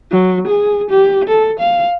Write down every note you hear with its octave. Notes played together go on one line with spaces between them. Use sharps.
F#3
G#4
G4
A4
F5